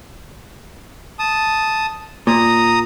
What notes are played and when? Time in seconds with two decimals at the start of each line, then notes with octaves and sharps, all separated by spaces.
1.19 A5 D#6
2.27 A#2 A#5 D#6